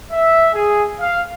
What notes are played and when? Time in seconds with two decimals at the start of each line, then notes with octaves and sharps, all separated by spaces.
0.12 E5
0.53 G#4
0.99 F5